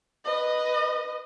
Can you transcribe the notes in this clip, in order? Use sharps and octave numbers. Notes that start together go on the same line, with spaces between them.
B4 D#5